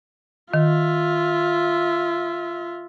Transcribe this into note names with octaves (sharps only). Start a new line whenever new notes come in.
D#3 F4 E5